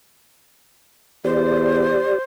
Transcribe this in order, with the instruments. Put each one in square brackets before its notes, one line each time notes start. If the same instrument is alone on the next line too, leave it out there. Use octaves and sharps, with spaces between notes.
[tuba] E2 [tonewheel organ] G4 D5 [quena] C5